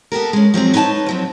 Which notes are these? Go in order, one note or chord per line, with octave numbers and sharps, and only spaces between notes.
B3 G4 A4 A#4
G#3 C#4
F3 F#3 G#3 C4
D#4 B4 C#5 G#5 A5
F3 F#3 C4